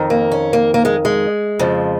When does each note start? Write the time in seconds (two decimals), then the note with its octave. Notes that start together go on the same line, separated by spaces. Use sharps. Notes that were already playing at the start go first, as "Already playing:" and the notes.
Already playing: F2 D#3
0.10 A#3
0.32 C#4
0.53 A#3
0.74 A#3
0.85 G#3
1.05 G#3
1.59 F2 C#3 F3